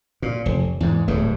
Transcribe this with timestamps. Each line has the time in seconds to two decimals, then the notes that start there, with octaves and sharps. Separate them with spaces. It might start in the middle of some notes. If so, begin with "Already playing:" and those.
0.22 A#2
0.46 F1
0.80 E2 G#2
1.08 D1 D#2 G#2 A3